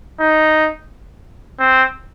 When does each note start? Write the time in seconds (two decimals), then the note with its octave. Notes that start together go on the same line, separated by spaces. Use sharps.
0.20 D#4
1.60 C4